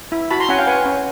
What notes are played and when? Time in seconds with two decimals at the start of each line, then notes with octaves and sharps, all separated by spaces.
0.12 E4
0.31 F#4 A5 B5
0.40 A#5 C6
0.49 C#4 F#5 G#5
0.59 F5 G5
0.67 B4 F#5 G#5
0.86 C#4